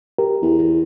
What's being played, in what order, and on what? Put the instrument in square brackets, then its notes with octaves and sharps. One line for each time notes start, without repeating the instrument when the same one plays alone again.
[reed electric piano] G4 A#4
[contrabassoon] E2